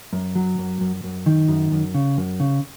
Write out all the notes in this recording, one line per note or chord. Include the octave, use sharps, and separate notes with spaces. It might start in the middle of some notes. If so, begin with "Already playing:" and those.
F#2
F#3
F#2
F#2
F#2
D#3
F#2
F#2
C#3
F#2
C#3